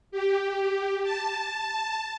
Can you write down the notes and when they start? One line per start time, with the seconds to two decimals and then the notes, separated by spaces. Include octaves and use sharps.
0.11 G4
1.03 A5